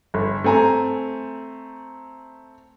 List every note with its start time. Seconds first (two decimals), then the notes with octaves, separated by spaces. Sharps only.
0.14 G1
0.44 A3 C4 G#5 A#5